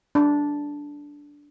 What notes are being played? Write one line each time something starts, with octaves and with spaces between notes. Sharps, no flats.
D4